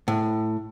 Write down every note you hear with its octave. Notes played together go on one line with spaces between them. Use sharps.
A2